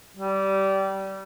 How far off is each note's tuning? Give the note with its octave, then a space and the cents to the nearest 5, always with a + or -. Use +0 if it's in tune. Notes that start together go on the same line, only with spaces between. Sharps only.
G3 -20